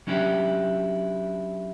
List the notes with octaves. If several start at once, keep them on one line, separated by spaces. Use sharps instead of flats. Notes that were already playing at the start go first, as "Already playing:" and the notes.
F#3 C#4 D4 E4 G4